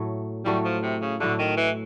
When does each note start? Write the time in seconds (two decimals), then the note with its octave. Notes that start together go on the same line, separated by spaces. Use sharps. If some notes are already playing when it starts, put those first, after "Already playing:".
Already playing: A2 F#3 A3
0.45 A2 F#3 G3 A3
0.65 F3
0.83 C3
1.02 C#3
1.20 A2 D3 F#3 A3
1.39 D#3
1.57 E3